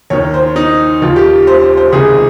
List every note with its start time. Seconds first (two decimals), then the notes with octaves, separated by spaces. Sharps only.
0.10 D#2 D#3 C#5
0.34 C5
0.56 D#4
1.02 D#2 D#3 F4
1.16 G4
1.47 C5
1.62 C5
1.77 C5
1.92 C#2 C3 D#3 G#4